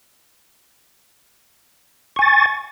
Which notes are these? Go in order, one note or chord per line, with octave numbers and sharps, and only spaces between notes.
G#5 C#6 A6